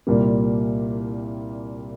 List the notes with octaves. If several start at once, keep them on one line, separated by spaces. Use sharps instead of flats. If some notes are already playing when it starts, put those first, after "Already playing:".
C2 A#2 G3 A#3